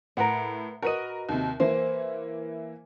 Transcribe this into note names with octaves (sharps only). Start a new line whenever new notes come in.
A2 A#4 B4 F#5
F#4 A#4 B4 D#5 D#7
D#2 C3
E3 A#3 E4 C5